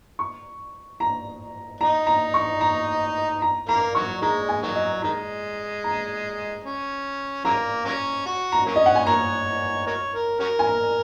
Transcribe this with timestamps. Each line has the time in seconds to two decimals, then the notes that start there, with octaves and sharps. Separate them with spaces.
0.19 C#6
1.00 A#5
1.81 D#4 A#5
2.07 A#5
2.34 C#6
2.61 A#5
3.42 A#5
3.68 A#3 A#5
3.95 D#3 F#3 C#6
4.22 D#3 G#3 A#5
4.49 G#5
4.63 D#3 F#3
4.76 D#5
5.02 D#3 G#3 A#5
5.84 A#5
6.64 C#4
7.45 C#3 F#3 A#3 A#5
7.85 F#3 A#3 C#4
8.26 F#4
8.52 A#5
8.66 F#3 A#3 C#4
8.76 D#5
8.86 F#5
8.95 G#5
9.06 F#4 A#4 C#5 A#5
9.87 F#4 A#4 C#5
10.14 A#4
10.40 C#4 F#4 A#4
10.59 G#5
10.67 A#5